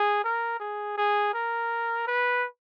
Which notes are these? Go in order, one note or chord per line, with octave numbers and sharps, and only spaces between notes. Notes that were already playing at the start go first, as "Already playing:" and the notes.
Already playing: G#4
A#4
G#4
G#4
A#4
B4